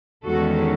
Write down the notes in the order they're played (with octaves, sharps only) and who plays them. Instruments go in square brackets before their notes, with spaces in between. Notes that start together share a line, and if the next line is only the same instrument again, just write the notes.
[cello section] E2 D#3 G#3 C#4 F#4 A4